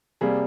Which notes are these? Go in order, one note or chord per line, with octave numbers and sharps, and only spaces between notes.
C3 G3 A#3 G#4